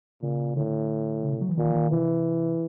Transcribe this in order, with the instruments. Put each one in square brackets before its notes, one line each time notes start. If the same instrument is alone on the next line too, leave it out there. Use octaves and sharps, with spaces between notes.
[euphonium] A#2 [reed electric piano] C#3
[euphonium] A2 [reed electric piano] D3
[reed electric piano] C#3
C3
F#3
E3
[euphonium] A#2 [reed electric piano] D#3
[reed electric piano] E3
D#3
[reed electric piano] C3 [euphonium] E3